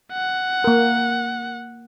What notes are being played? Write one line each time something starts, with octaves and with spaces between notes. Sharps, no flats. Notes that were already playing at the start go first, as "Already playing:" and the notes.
F#5
A#3 A#4